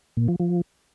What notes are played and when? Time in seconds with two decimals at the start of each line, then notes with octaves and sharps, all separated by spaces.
0.17 A#2
0.28 F3
0.40 F3